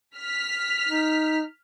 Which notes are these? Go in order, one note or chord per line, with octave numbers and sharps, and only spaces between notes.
F6 B6
D#4